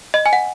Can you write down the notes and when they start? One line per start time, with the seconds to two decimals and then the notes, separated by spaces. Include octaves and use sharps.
0.14 D#5
0.26 G#5
0.33 F#5